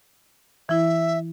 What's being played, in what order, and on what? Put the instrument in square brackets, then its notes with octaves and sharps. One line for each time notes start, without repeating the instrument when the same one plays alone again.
[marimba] E3 E4 [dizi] E5